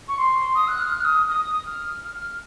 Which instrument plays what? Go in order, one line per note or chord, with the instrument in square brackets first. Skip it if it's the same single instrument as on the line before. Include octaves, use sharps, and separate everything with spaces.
[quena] C#6
C6
D#6
F#6
F6
F#6
F6
D#6
D#6
F6
F6